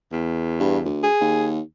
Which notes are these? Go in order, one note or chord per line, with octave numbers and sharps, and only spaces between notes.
E2
G2
D2
G#4
D#2